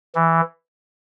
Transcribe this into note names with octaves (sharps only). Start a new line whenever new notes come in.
E3